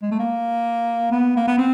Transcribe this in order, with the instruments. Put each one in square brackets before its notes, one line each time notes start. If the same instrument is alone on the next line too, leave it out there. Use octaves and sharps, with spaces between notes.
[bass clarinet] G#3
A3
A#3
B3
A#3
B3
C4